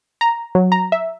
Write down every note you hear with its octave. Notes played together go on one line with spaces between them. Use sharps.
A#5
F#3
A#5
E5